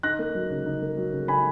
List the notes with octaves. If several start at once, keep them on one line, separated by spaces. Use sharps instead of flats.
D#4 F#6 A#6
A#3
F#3
C#3
D#4
A#3
F#3
C#3
D#4 G#5 B5